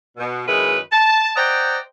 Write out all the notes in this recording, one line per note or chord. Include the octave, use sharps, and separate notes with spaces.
B2
F#2 D#3 G#3 E4 B4
A5
C5 D5 D#5 F#5 G5 A#5